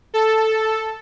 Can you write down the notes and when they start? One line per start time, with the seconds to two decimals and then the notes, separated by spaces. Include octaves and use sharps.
0.14 A4